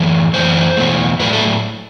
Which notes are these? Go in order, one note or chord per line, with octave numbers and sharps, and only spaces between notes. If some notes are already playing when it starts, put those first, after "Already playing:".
Already playing: F#2 E3 A3
F#2 E3 A3 C5
E2 B2 A3
A2 F#3 A3 B4
A4